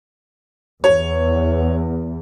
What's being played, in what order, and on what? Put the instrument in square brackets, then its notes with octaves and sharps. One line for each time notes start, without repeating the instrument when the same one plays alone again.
[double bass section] E2 [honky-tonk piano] C#5